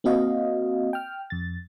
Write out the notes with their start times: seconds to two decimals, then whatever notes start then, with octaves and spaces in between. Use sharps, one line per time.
0.04 A#3 C4 F#4 D#5 F5
0.93 G5 F6
1.30 F2 A6